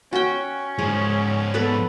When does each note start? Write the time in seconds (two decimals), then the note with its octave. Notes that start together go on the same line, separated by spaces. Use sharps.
0.13 C#4 F#4 G5
0.79 G#2 F3 G#4
1.54 B3 A4 B4